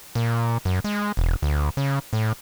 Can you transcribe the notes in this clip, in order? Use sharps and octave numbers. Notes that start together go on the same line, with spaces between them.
A#2
F#2
G#3
E1
D2
C#3
A2